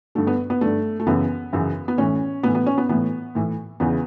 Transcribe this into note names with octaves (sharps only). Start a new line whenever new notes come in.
G2 D3 A3
B3
B3
G2 D3 A3
A3
F#2 C#3 E3 B3
F#2 C#3 E3
B3
A2 E3 C#4
A2 E3 B3
B3
C#4
B3
A2 E3 B3
A2 E3
E2 C#3 E3 B3